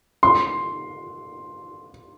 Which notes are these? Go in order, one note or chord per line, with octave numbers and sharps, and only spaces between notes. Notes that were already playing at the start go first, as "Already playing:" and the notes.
C6